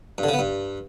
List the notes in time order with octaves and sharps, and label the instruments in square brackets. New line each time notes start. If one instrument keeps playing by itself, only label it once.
[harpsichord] G2
D3
C#3
B3
G2